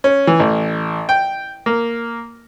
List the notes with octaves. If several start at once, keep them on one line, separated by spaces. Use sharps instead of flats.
C#4
E3
A1
G5
A#3